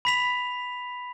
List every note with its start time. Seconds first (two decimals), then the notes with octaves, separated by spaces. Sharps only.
0.05 B5 B6 F7